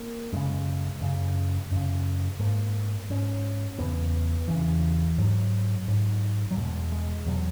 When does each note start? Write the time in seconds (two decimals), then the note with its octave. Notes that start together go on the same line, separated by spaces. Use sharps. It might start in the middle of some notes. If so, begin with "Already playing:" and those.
Already playing: A#3
0.32 F#2 C#3 G#3
1.01 F#2 C#3
1.71 F#2 C#3
2.39 G#2 A#3
3.10 G#2 C#4
3.79 E2 C#3 B3
4.48 E2 C#3 E3
5.18 G#2 F#3
5.88 G#2
6.51 F#3
6.56 E2 B2 G#3
6.92 G#3
7.26 E2 B2 F#3